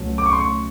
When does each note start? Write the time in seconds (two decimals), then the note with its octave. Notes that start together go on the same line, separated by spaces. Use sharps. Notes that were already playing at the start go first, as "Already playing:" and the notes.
Already playing: C#2 B2 F#3 A3 C#4
0.18 D6
0.26 C#6
0.33 C6
0.40 C#6